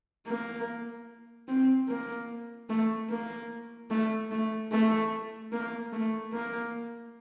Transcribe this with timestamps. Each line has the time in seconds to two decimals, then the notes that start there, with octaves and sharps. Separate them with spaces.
0.27 A#3
1.48 C4
1.88 A#3
2.70 A3
3.10 A#3
3.90 A3
4.31 A3
4.72 A3
5.52 A#3
5.93 A3
6.33 A#3